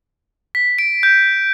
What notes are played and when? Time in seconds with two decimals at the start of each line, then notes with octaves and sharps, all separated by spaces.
0.55 B6
0.79 D7
1.03 G6